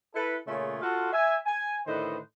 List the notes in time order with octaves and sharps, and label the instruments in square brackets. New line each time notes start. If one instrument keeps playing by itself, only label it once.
[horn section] E4 A4 B4
A#2 C#3 A3 F4 G#4 C#5
F4 F#4 A4
E5 G#5
G#5
A2 D3 D#3 B4 C5 D#5